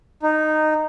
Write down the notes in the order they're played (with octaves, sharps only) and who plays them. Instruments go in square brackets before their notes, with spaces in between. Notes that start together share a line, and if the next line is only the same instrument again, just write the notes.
[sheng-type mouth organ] D#4